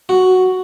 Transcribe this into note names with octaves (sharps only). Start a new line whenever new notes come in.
F#4